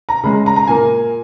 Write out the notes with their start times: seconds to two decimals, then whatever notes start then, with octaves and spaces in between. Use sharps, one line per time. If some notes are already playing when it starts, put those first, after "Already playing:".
0.09 A#5
0.24 C#3 G#3 B5
0.46 A#5
0.56 A#5
0.68 A#2 A#3 G#5